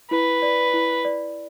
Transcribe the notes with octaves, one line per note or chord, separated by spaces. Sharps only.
E4 B4
D5
E4
D5